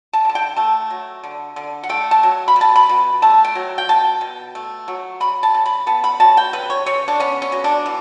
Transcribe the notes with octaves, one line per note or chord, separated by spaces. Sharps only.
A5
D3 A5
G5
A3 A5
F#3
D3
D3
F#5
A3 G5
A5
F#3
B5
B2
A5
B5
B2
A3 A5
G5
F#3
G5
B2 A5
B2
A3
F#3
C#3 B5
A5
C#3
B5
B3 A5
B5
F#3 A5
G5
C#3 B4
C#5
C#3 C#5
D4
B3 C#4
C#4
F#3
D4
E3